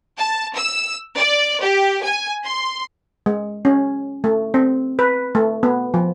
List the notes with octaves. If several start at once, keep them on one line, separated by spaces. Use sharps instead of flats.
A5
E6
D5
G4
G#5
C6
G#3
C#4
A3
C4
B4
A3
B3
F3